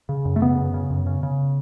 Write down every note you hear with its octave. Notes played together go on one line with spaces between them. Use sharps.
C#3
F#2
A3
C#3 B3
F#2
C#3
F#2
C#3
C#3